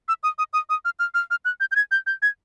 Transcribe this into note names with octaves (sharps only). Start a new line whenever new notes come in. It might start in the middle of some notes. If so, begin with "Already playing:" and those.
E6
D#6
D#6
D#6
D#6
F6
F6
F6
F6
F#6
G6
G6
G#6
G6
G6
G#6